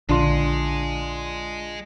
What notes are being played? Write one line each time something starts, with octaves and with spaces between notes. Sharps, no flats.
A#1 D3 G#3 D4 F4 C6